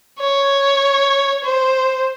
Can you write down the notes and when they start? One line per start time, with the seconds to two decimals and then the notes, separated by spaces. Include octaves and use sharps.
0.20 C#5
1.44 C5